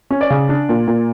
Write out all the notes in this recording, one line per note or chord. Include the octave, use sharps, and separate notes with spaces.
C#4
D5
C#3
D4
A#2
A#2